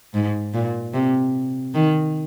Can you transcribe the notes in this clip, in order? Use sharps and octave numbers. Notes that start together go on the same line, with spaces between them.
G#2
A#2
C3
D#3